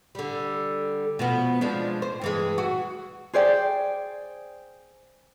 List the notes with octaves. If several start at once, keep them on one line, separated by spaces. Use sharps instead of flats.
D3 G3
B2 F3 B3
F3 G#3 D4
C5
G2 E3 G#3
F#4
G#4 C5 D5 G5